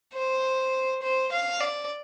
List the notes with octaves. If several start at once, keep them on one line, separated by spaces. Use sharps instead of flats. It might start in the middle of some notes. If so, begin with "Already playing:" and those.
C5
C5
F5
D5